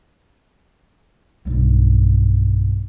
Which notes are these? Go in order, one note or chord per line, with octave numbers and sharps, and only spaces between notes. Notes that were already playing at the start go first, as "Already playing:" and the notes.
B1 G2